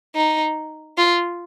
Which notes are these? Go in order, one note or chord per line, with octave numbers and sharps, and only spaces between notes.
D#4
F4